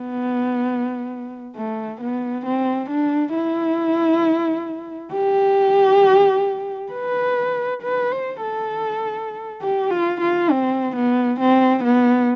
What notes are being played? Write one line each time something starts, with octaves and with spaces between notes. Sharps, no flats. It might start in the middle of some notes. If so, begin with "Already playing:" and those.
Already playing: B3
A3
B3
C4
D4
E4
G4
B4
B4
C5
A4
G4
F4
F4
C4
B3
C4
B3